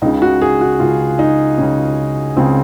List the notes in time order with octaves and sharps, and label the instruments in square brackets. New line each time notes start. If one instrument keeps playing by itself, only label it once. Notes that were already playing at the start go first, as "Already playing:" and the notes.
[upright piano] C#2 D#4
C#3
F#4
G#4
F#4
C#2 C#3 F4
D#4
C#2 C#3 C#4
C#2 C#3 C4